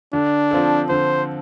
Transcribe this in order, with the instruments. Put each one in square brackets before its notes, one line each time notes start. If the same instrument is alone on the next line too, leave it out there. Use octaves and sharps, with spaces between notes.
[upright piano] D3 [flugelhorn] D4
[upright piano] F3 C4 F4 A4
[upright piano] D3 [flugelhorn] C5